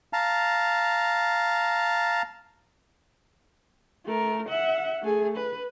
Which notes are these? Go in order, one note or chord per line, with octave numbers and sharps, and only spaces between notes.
F5 A5 A#5
A3 A#4
E5 F#5
A3 G#4
B4